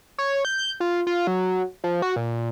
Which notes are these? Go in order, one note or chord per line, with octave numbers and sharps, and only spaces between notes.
C#5
G6
F4
F4
F#3
F3
F#4
A#2